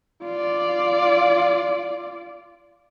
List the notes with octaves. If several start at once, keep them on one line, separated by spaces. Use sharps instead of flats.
F4 D5